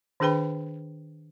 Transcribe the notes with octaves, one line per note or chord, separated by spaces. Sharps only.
D#3 D4 G#4 B4 G5 B5